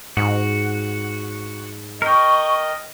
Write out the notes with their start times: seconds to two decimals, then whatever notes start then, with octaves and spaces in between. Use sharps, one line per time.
0.17 G#2 F#4
2.02 A#4 D#5 G5 C#6